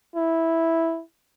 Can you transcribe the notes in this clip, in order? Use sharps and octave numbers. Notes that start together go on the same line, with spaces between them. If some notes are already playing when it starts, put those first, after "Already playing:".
E4